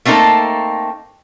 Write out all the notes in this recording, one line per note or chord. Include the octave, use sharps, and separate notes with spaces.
A3 A#3 C4 D#4 A4